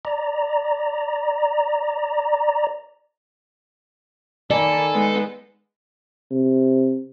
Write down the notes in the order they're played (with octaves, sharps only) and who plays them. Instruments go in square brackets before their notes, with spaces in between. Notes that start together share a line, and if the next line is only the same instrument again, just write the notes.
[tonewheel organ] D5 A#5
[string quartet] D#3 A#3 B5 [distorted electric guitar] A4 [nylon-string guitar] D5 [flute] G#5
[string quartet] G#3 B3 D#4
[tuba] C3